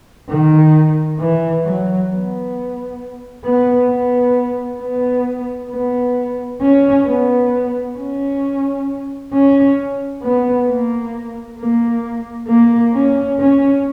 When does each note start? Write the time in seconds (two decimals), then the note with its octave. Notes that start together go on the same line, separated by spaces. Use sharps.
0.29 D#3
1.19 E3
1.64 F#3
2.10 B3
3.45 B3
3.90 B3
4.81 B3
5.71 B3
6.61 C#4
7.07 B3
7.97 C#4
9.33 C#4
10.23 B3
10.68 A#3
11.59 A#3
12.49 A#3
12.94 C#4
13.40 C#4